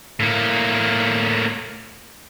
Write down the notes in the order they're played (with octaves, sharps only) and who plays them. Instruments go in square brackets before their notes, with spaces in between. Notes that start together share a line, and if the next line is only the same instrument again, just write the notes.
[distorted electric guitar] A2 A#3